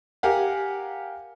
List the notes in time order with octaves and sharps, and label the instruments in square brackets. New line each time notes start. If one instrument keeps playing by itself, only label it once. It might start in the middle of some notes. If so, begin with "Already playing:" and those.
[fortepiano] G4 A#4 F5 F#5 G#5